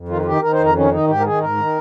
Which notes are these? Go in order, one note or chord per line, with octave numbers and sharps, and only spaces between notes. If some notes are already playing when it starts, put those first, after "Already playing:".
Already playing: F2
D#3 F4
F4
D#3 G4
D#3 A#4
C5
F2
A#4
D#3 C#4
D#3 D#4
G#2 G4
A#4
D#3 G#4
G#2 A#4
D#3